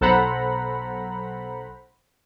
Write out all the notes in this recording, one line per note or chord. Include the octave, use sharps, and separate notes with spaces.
B1 A4 C5 F#5 A#5 B5